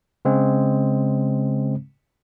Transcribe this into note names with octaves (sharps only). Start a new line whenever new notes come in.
C#3 G#3 C4